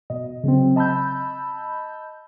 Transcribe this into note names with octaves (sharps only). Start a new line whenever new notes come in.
B2 D#5
C#3 F#3 C4
D#5 A5 B5 E6 G6